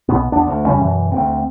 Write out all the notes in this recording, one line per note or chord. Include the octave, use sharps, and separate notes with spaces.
B1 B2 B3
E2 B3 D4
D2
F2 C#3 G3 C#4
F#2 B2 E3
D2 B3 C4